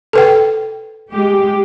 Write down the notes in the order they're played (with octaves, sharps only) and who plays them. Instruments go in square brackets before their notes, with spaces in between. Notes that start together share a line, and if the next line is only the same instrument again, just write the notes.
[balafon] A4 B4 G5
[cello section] G#3 G4